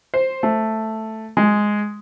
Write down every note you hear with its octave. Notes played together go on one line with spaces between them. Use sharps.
C5
A3
G#3